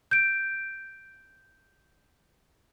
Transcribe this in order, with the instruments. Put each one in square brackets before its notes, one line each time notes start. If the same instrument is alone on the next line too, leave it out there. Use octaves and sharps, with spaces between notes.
[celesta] G6 D7